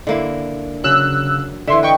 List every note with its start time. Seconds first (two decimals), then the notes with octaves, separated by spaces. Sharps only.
0.07 D3 A#3 E4
0.84 C#3 F#3 E6 F#6
1.67 D3 E3 E5 C6
1.83 B4 D#5 G5 C#6